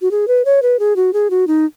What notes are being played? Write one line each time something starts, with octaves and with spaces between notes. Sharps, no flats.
F#4
G#4
B4
C#5
B4
G#4
F#4
G#4
F#4
D#4